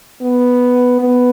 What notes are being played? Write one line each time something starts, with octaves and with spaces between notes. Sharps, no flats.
B3
B3